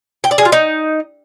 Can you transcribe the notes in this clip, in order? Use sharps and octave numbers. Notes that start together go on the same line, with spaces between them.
G5
D5
G#4
F4
D#4